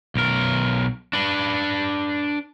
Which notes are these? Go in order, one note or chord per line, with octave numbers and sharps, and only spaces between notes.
B1 A#4
D4 B4